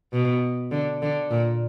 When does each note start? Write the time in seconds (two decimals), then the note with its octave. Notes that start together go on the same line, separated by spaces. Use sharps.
0.13 B2
0.71 D3
1.02 D3
1.31 A#2